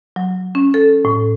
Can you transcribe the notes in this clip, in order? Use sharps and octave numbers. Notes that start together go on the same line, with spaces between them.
F#3
C#4
A4
A2